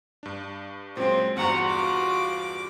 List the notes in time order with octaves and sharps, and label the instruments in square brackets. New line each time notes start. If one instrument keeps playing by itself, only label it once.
[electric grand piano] G2 D4
[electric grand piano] A#2 F#3 G#3 [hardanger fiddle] C4
[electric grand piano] E2 G2 [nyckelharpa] F4 F#4 [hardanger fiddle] F#5 A#5
[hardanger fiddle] D6